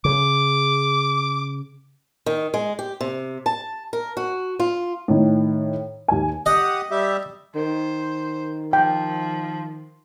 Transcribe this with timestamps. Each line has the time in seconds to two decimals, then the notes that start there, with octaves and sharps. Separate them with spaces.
0.05 C#3 D6
2.26 D#3
2.54 G#3
2.79 G4
3.01 C3
3.46 A5
3.93 A#4
4.17 F#4
4.59 F4
5.08 A2 D#3
6.08 D#2 G#5
6.46 G4 D#5 F#5 D#6
6.91 G3 G4 E5
7.55 D#3 C5
8.73 F3 G5